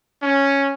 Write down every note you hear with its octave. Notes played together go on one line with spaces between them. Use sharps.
C#4